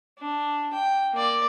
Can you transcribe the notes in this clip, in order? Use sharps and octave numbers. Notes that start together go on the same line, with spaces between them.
D4
G5
A#3 D5